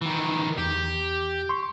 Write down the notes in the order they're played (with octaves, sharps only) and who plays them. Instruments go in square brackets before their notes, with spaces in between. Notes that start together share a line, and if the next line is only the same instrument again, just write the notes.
[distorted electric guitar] D#3 E3
[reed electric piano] E2 [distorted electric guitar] G4
[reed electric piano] C6 C#6